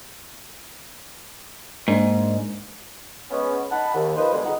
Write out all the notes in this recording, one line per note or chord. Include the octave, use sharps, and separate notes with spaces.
G#2 A#3 D4
G#3 B3 C#4
D#4 F#5 A5 B5
D#2
F3 B4 C5 D#5
B2 D3 G3 G#3
C#2 D#4 F#5